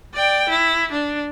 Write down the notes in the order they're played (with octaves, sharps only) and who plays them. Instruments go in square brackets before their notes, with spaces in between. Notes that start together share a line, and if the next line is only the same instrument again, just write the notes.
[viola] D5 G5
E4
D4